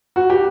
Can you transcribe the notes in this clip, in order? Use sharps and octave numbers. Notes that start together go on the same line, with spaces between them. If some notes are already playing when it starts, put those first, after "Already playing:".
F#4
G4